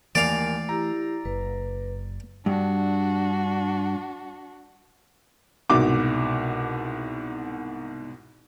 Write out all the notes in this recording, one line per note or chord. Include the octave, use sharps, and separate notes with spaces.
D#2 E3 A3 A#4 D5 F5 G#5
E4 G4 A#5
F#1 B4
G2 D4 F#4
C2 G#2 B2 D6